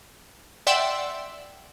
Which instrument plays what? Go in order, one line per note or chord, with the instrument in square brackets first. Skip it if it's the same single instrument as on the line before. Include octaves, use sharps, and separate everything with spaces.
[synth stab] D5 E5 F#5 G5 C6 E6